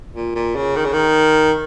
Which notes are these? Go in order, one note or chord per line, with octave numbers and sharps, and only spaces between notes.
A#2
A#2
C#3
D#3
C#3
D#3